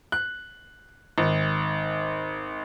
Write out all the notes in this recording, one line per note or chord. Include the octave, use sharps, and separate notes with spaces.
F#6
G#1